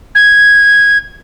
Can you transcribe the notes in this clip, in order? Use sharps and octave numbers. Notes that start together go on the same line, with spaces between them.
G#6